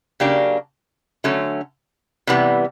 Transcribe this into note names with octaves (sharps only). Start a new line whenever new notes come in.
C#3 F#3 A#3 D4 G4
D3 F#3 A3 C#4
C3 E3 G3 B3